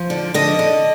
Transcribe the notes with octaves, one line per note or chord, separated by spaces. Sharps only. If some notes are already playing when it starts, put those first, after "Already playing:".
Already playing: F3
D3
D3 D#5
D3